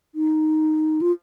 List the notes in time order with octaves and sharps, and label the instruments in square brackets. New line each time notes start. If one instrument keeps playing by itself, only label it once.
[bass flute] D#4
F4